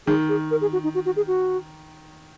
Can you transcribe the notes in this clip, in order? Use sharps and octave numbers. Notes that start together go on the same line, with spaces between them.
D#3 G#4
G#4
A#4
G#4
F#4
D#4
F#4
F#4
G#4
F#4